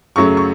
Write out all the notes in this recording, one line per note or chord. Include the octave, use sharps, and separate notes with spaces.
F#2 C#3 F#3 A3 C#6
C#6